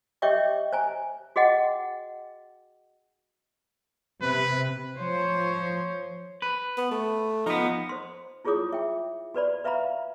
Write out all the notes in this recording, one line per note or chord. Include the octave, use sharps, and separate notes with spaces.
G4 C#5 D#5 E5 G5 D6
C5 G#5 A#5
F#4 G#4 D#5 F#5 G5
C3 B4
F3 C5 C#5
B4
B3
A3
F3 B3 D#4
C5 C6
E4 F4 G#4 C#5 D6 D#6
E5 G5
F#4 B4 D5 B5
B4 E5 F5 A#5 B5